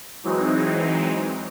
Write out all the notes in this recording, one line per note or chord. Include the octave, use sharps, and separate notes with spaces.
E3 F#3 G#3 C4 D#4